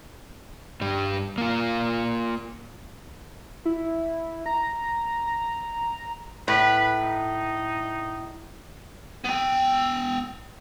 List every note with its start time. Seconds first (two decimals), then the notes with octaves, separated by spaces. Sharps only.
0.81 G2 G3
1.38 A#3 F4
3.65 E4
4.46 A#5
5.27 A#5
6.48 A2 B4
7.02 D#4
9.25 B3 G5